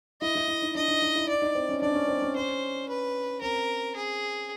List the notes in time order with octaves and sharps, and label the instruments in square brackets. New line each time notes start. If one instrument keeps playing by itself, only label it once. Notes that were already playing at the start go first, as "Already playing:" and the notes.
[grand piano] E4 [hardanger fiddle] D#5
[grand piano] E4
E4
D#4
[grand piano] D4 [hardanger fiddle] D#5
[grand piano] D#4
D#4
E4
[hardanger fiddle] D5
[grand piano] D#4
C4
C#4
[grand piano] D4 [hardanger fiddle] D5
[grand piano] C#4
C4
C#4
[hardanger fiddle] C5
B4
[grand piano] C4 [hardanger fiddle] A#4
[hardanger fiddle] G#4